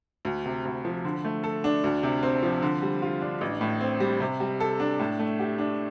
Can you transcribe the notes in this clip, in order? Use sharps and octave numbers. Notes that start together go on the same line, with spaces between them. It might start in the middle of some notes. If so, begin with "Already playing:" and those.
D2
C3
D2
F3
D3
A3
A4
D4
D2
C3
C4
F3
D3
G3
F4
D4
A1
A2
C4
G3
C3
G3
A4
D4
A2
A3
G4
D4